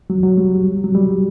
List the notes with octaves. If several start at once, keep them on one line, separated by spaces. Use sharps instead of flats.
F#3
F#3
G3
F#3
G3